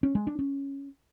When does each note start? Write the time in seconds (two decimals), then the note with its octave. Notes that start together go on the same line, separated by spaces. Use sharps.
0.03 C#4
0.15 G#3
0.27 D4
0.39 C#4